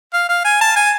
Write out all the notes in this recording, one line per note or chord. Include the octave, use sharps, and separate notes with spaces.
F5
F5
G#5
A5
G#5